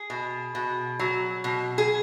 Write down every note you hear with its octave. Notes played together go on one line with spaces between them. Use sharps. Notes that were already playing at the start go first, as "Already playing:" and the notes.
Already playing: G#4
B2
B2
F#3
B2
G#4